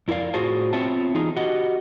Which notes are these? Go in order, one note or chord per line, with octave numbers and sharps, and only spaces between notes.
F2 E4 A#4 D5 F5
A2 F4 F#4 G#4 C5 A5
B3 C4 F4 C#5 E5 A5
E3 D#4 F4 G#4
F#4 G4 D#5 F#5